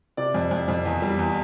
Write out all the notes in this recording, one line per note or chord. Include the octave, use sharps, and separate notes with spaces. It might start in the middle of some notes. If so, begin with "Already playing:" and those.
C3 D5
F2
F2
F2
E2
G3
E2